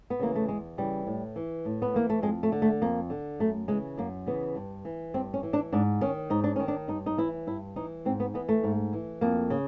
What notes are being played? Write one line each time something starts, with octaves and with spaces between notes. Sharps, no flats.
B3
C#3 E3 A#3
A3
E2 G#3
C#3 E3 G3
A2
E3
A2
B3
E3 A#3
A3
F2 G#3
A3
D3
A3
F2 A#3
D3
F#2 A3
C#3 E3 G#3
F#2 A#3
C#3 E3 B3
G2
E3
G2 C4
C#4
E3
D4
G#2 D4
D#3 C#4
G#2 D#4
D4
D#3 C#4
D4
G2 D#4
D#4
E3 E4
G2 E4
E3 D#4
G#2 C4
B3
E3 B3
A3
G#2
E3
F2 A#3
C#3